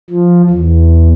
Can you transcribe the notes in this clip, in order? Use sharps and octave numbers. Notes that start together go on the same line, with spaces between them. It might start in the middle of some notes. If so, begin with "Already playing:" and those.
F3
E2